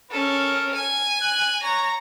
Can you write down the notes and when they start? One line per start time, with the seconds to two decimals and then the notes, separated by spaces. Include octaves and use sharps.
0.11 C#4 A4 A#4
0.74 G#5
1.22 F#6
1.63 C#5 A#5